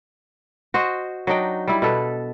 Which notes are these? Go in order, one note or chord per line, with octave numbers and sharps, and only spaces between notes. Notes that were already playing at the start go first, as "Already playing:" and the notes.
F#4 C5 D#5
F#3 D4 D#4 G5
G3 E4
B2 A4 B4